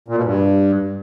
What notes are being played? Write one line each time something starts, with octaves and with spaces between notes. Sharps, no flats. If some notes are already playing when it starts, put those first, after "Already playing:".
A#2
B2
G2